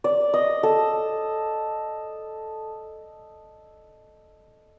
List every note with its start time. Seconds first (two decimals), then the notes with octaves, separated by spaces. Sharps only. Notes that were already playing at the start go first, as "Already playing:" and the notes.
0.04 D5
0.34 D#5
0.63 A4